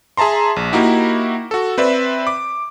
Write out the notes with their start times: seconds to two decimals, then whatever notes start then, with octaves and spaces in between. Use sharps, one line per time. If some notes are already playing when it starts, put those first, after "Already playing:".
0.17 G#4 E5 A5 A#5 C6
0.56 A#1
0.72 A#3 D#4 E4 F#4 G4
1.51 F#4 A4
1.78 C4 B4 D5 E5
2.27 D6